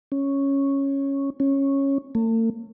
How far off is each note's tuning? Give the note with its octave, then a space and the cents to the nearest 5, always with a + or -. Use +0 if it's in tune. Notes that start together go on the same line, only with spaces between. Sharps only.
C#4 -5
C#4 -10
A3 +45